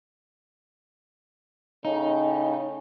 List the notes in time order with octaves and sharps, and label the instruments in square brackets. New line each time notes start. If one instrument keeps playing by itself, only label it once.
[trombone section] A2 C#3 [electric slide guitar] D#4